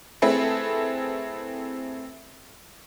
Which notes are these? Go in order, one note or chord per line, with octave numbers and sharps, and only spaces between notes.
A3 C4 E4 G#4 A4 B4